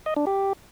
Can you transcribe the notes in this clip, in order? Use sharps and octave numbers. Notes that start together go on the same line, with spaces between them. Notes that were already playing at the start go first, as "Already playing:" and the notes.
D#5
D4
G4